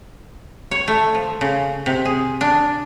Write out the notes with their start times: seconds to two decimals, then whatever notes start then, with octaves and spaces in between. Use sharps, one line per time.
0.71 C#5
0.88 A3
1.15 F3
1.41 C#3
1.86 C3
2.05 G#4
2.41 D4